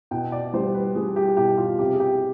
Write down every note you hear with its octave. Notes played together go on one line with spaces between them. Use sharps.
B2 G5
D5
G3 C5
B4
G3 G#4
G4
B2 G4
F4
C3 G4
G#4
G4